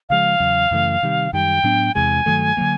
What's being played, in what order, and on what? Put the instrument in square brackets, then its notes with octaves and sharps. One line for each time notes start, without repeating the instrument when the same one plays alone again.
[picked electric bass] C#3 F3 G#3 [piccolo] F5
[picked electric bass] E2 C#3 F#3
F#2 C#3 E3 A3
C3 D#3 G3
[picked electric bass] F#2 D#3 G3 [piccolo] G5
[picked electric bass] A2 F#3 B3 D4
[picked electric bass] E2 C3 E3 G#3 [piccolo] G#5
[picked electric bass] G2 D#3 F#3 A3
D3 F#3 A#3